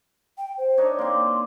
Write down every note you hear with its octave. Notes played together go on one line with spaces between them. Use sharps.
G5
C5
D4 D#4 C#5
A#3 C4 C6